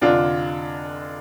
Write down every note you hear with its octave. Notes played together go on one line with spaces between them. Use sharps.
F1 F2 D3 D4 F4